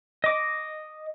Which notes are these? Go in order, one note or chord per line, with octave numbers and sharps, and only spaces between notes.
D#5 D6